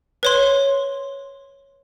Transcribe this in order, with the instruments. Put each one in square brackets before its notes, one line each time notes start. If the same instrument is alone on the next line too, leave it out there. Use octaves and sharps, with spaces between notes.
[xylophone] B4 C#5 C6